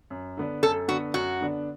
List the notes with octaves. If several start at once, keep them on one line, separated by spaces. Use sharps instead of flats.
F#2
D3 B3 D4
F#2 A4
D3 B3 D4 F#4
F#2 F#4
D3 B3 D4